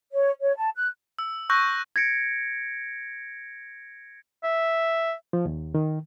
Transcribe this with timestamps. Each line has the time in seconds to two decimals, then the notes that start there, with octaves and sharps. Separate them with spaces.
0.12 C#5
0.41 C#5
0.56 A5
0.75 F#6
1.19 E6
1.50 C#6 E6 F#6 G6 A#6
1.96 G#6 A#6 C#7 D7
4.44 E5
5.33 F3
5.45 D#2
5.75 D#3